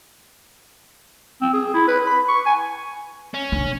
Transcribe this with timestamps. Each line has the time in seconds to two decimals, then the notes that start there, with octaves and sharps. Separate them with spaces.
1.42 C4
1.53 G#4
1.74 E4
1.88 B4
2.07 B5
2.28 C#6
2.46 G#5
3.34 C#4
3.52 B1 D3